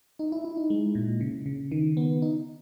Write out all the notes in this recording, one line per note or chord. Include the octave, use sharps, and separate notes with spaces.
D#4
E4
E4
D#4
G#3
A#2
C#3
C#3
D#3
B3
D#4